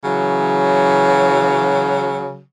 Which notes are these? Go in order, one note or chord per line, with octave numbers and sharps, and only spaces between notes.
C#3 E3 F#3